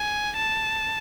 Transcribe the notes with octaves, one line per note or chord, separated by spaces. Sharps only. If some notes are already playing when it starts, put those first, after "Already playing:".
Already playing: G#5
A5